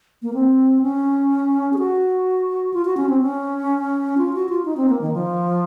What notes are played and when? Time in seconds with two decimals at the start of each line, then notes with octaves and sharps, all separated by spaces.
0.22 A#3
0.34 C4
0.82 C#4
1.73 G#4
1.78 F#4
2.74 F4
2.85 F#4
2.97 C#4
3.09 C4
3.21 C#4
4.18 F4
4.34 F#4
4.49 F4
4.65 D#4
4.77 C4
4.89 A#3
5.01 D#3
5.13 F3